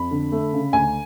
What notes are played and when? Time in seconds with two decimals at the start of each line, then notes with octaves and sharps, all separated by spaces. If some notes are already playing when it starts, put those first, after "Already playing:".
Already playing: F2 B5
0.11 D3
0.32 A3
0.53 C#3
0.73 D2 G#5